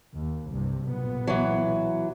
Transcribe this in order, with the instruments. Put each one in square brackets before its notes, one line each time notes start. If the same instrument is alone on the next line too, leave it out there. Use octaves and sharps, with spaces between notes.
[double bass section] D#2
C2 G2 C3
B1 A#2 B3
[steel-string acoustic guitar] E3 F#3